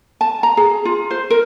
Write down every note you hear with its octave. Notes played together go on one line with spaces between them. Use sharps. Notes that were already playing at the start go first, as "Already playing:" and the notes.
A5
A#5
G#4
F4
C5
A#4